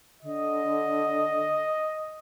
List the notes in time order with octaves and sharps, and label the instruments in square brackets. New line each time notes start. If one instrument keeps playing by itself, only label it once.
[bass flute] D3 [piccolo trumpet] D#5